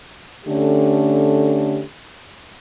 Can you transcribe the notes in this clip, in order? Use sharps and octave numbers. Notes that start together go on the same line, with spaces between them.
D3 A3 C#4 G4